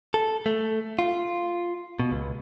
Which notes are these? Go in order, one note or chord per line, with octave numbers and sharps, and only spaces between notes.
A4
A3
F4
B2
C#2